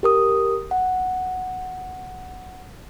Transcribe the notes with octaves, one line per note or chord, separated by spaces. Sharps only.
G4 A#4 D#6
F#5